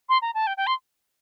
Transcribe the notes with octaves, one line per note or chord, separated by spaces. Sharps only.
C6
A#5
A5
G5
G5
C6